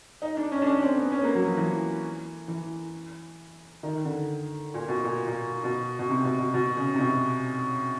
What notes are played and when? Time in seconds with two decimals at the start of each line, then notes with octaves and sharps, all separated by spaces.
0.22 D#4
0.37 D4
0.51 C#4
0.62 D4
0.66 C#4
0.78 C#4
0.82 C4
0.97 B3
1.11 C#4
1.18 B3
1.24 A#3
1.35 F#3
1.46 F3
1.57 E3
2.48 E3
3.83 D#3
4.05 D3
4.74 A#2
4.88 B2
5.04 A#2
5.27 A#2
5.64 B2
5.99 B2
6.10 C3
6.25 B2
6.39 B2
6.54 B2
6.77 C#3
6.94 C3
6.99 B2